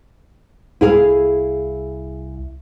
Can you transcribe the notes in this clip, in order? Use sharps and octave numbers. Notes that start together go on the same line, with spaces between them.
C2 E4 G#4 F5